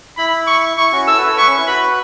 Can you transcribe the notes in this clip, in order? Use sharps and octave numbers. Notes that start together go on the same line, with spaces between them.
E4 B5
C#6
E4 C#6
C#4 F#4
E4 A4 E6
F#4 B4
A4 C#5
B4 E5 C#6
C#4
E4
F#4 B4 B5